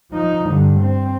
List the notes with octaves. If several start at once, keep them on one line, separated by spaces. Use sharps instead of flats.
F3 D#4
G2 D3
C4